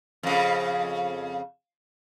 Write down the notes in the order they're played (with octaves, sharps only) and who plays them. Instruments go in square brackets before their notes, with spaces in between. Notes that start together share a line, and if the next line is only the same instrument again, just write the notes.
[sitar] F2 C#3